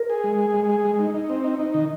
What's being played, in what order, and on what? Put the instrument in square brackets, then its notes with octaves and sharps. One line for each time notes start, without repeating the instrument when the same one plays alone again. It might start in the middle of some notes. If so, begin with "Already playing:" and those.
Already playing: [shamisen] A#4
[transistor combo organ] G#4
G#3
G#4
G#3
G#4
G#3
D#4
D#4
C4
D#4
D#4
D#3